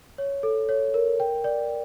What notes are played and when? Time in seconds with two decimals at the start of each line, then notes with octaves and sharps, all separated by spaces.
0.18 C#5
0.43 A4
0.69 C#5
0.94 A#4
1.20 G5
1.44 D5